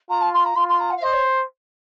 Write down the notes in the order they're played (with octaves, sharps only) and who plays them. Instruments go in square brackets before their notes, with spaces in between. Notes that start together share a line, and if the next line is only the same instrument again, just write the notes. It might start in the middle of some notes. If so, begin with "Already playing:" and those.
[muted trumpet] F4 [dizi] A#5
[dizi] A5
C6
A#5
[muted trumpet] F4 [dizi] C6
[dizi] C6
A#5
F#5
F5
[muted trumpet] C5 [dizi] D#5
[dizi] C#5